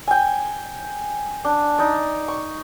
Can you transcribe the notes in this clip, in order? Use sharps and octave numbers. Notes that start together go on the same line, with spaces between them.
G5 G#5
D4
D#4 D5
C#6